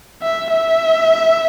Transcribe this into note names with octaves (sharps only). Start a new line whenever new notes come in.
E5
E5